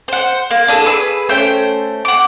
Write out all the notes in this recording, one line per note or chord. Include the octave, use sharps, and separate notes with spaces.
C5 F#5
A#3
D4 E4 G#4 A4
G#4 B4 E6
A3 C#4 C5 G5
F#5 D6